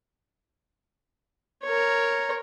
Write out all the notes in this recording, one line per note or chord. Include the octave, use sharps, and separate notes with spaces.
A#4 C#5